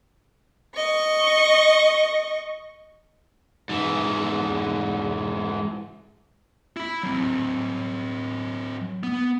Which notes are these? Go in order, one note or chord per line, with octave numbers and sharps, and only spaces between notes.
D#5 C#6
G#2 E3
E4 B5
F#3 C4
B3